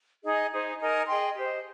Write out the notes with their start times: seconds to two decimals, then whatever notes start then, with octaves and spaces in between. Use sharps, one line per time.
0.23 D#4 G#4 D#5 G#5
0.51 D#4 G#4 C5
0.79 D#4 A#4 D#5 G#5
1.08 G#4 D#5 G5 C6
1.35 G4 C5 D#5